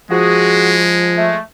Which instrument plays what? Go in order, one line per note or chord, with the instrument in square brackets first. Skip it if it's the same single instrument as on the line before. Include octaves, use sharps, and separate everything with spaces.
[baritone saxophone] F3 [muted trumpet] G#3 [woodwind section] F#4 G#4
[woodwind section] A3